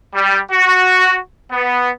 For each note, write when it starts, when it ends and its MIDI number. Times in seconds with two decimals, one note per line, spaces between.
0.15 0.39 55
0.51 1.18 66
1.51 1.89 59